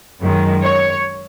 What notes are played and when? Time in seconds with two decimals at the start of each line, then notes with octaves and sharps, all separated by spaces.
0.20 F#2 D#3 G#3
0.62 C#5